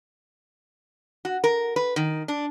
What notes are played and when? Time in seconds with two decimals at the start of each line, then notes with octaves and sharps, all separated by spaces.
1.25 F#4
1.44 A#4
1.76 B4
1.96 D#3
2.28 D4